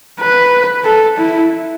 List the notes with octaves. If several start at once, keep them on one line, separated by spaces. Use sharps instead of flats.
B4
A4
E4